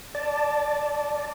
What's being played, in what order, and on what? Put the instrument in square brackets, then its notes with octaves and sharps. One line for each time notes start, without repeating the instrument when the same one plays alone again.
[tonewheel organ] D5 A5